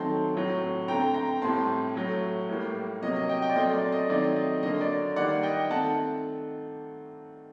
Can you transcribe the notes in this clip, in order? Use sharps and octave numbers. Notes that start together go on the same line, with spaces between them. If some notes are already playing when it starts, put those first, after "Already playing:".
Already playing: D#3 F#3 A3 C4 A5 C6
A2 F#3 A3 C4
D3 A3 C4 G5 A#5
G5 A#5
A2 G3 C4 A5 C6
A2 F#3 A3
A2 G3 A#3
C3 F#3 A#3 D#5
D#5
D#5 G5
D#5 G5
D5
A#2 F#3 A3 C4 D#5
D5
D#5
D#3 F#3 A3 C4 D5
D#5
D3 F#3 A#3 D#5
D5
D#3 G3 A#3 D5 F#5
D#5 G5
D#3 A3 C4 F#5 A5